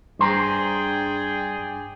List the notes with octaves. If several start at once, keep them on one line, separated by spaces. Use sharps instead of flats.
G2 G#4 C5 D5 G5 A#5